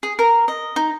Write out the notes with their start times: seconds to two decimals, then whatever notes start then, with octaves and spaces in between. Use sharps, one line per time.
0.03 G#4
0.19 A#4
0.48 D#5
0.76 D#4